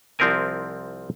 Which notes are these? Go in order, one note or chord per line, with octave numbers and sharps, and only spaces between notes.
C2 F3 C4 E4 A#4 G#5